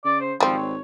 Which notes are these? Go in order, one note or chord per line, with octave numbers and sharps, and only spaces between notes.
C#3 D5
C5
G#1 F3 G3 C4
C#5